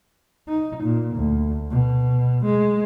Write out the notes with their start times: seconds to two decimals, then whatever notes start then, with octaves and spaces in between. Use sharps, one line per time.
0.48 D#4
0.84 A#2
1.16 D2
1.71 B2
2.45 G#3